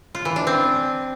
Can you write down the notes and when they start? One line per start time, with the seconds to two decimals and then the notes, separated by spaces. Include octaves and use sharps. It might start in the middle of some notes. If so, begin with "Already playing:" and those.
0.15 F4
0.25 E3
0.36 D4
0.47 C4